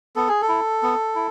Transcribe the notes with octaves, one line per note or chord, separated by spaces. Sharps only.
B3 A4
G#4
A4
E4
B3
E4